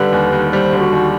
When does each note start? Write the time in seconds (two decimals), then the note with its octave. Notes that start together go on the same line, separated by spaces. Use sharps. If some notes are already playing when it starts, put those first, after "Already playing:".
Already playing: D3 G3 B4
0.12 D#2
0.33 D#2
0.52 G3 C5
0.73 D3
0.79 F#4
0.92 D#2